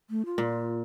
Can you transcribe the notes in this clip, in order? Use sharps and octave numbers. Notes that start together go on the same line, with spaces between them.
A3
F4
A#2